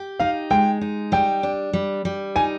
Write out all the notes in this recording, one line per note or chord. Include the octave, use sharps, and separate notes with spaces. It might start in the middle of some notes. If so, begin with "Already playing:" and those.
Already playing: G4
D#4 F5
G#3 G5
D#4
G3 G5
D4
G3
G3
D#4 G#5